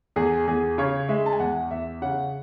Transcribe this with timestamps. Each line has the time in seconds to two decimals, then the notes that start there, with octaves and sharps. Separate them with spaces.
0.16 E2 G#4
0.47 E2 G#4
0.78 C#3 C#5
1.09 G#3 E5
1.26 A5
1.33 G#5
1.40 E2 F#5
1.71 E2 E5
2.02 C#3 F#5